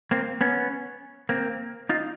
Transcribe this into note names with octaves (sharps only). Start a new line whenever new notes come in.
A#3 C4
B3 C#4
A#3 C4
D#4 F4